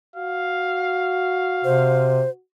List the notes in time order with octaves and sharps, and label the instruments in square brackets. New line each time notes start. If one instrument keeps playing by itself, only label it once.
[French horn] F#4 [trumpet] F5
[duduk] C3 [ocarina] C5